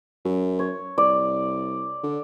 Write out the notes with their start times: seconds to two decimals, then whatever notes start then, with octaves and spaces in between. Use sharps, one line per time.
0.25 F#2
0.59 C#5
0.98 C2 D5
2.03 D3